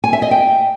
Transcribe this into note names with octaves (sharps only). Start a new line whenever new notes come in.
G#5
E5
D#5
G5